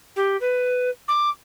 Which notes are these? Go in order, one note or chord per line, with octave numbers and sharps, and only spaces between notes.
G4
B4
D6